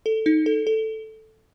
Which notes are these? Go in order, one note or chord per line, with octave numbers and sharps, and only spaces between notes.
A4
D#4
A4
A4